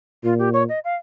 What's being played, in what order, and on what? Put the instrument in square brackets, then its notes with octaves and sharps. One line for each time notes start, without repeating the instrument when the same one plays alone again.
[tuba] A#2 [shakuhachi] F4
[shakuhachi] G4
C#5
D#5
F5